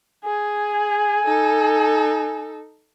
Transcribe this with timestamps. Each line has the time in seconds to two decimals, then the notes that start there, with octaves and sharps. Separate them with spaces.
0.24 G#4 G#5
1.25 D#4 A4